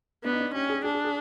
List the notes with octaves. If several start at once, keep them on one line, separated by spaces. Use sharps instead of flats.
B3 D4
D#4
D4
C#4 G4
G#4
D4 G#4
G#4
G#4